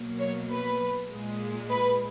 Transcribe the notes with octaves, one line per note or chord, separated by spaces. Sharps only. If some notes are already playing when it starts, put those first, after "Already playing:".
Already playing: B2 F#3 A#3
C#5
B4
A#2 G#3
B4